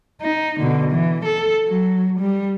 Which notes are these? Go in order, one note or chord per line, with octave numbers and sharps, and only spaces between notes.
D#4
B2 D3
E3
A4
F#3
G3